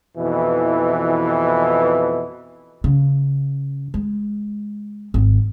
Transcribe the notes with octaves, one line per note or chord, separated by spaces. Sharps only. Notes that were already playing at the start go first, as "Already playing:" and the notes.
F2 B2 E3
C#3
G#3
G#1